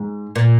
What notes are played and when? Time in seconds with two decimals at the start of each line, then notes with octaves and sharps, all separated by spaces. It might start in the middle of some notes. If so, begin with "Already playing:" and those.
Already playing: G#2
0.36 A#2